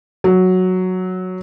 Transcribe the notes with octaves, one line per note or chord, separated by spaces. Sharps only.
F#3